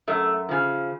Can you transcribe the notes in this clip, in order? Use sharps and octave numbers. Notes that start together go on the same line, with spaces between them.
F#2 A3
C#3 F3